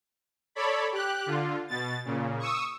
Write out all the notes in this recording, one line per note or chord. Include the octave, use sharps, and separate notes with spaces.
A4 C#5 D5 B5
G4 F#6
D3 F4
B2 A6
A#2 C#3
C#6 D#6 E6